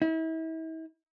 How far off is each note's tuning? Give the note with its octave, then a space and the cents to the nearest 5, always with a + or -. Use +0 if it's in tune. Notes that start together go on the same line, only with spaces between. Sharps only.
E4 -40